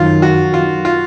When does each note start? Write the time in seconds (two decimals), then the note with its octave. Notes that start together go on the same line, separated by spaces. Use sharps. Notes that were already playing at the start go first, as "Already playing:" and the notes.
Already playing: F#2 D#3 F#3 F4
0.22 F#4
0.54 F4
0.85 F4